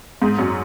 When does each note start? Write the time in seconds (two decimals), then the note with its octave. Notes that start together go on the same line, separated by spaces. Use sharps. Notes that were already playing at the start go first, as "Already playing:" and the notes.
0.22 G#2
0.39 F#2